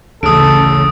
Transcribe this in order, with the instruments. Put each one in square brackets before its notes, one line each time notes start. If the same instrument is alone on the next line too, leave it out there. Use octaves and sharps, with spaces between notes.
[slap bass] A1 D2 [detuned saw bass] C#3 [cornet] A4 [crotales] D#6 D7